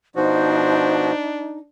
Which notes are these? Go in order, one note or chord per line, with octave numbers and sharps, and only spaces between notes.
B2 F3 D4 D#4 F#4 C5